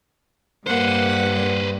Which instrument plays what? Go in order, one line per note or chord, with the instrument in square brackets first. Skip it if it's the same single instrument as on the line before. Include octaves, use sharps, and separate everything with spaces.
[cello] G2 [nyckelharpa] A#3 F#5 [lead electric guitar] B4 C5